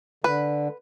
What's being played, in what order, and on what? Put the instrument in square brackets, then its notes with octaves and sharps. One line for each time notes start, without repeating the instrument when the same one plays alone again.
[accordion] D3 [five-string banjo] B4